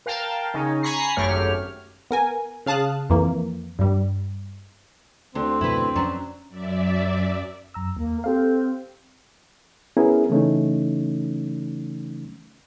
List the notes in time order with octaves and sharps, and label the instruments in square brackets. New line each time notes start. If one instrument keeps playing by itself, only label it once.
[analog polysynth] A#4 F5 G5 A5
C#3 C#4 D#4
G#5 A#5 B5 C#6 A#6 C7
G#1 F#2 A3 G4 C#5 F6
[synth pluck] B3 A#4 G#5
C#3 F5 A5 D#6 F#6
F2 E3 A#3
G2 G3
[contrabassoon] D2 [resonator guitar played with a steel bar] D3 [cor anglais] C4
[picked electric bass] F2 B2 D3 [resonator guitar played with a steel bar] E4 B4
[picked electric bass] F2 C#4 [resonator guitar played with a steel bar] F#3 D4
[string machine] F#2 D5 E5
[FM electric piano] F#2 A#5 E6
[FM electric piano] D#2 [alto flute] A#3
[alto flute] C4 [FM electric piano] G4 A4 F5
[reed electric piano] B3 C#4 E4 G#4 A#4
C#3 E3 A3 C#4 D#4